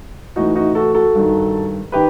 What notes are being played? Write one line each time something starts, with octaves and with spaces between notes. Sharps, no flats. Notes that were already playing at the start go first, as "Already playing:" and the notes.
A2 E3 D#4 F#4
D#4 F#4
F#4 A4
F#4 A4
G2 D#3
D#3 G4 B4